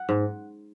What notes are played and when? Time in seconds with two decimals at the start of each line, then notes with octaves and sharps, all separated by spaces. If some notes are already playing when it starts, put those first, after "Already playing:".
Already playing: F#5
0.09 G#2